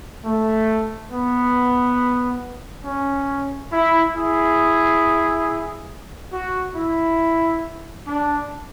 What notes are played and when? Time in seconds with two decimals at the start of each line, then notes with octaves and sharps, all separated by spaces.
0.24 A3
1.11 B3
2.84 C#4
3.71 E4
4.15 E4 G#4
6.32 F#4
6.75 E4
8.06 D4